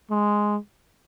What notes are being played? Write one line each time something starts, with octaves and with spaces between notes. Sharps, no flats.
G#3